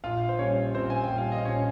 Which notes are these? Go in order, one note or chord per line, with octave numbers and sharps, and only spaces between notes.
A#1 F4 F5
C5
A#2 G3 C#4 C#5
A#1 C4 C5
G#5
G5
A#2 G3
F5
D#5
A#1 C#4 C#5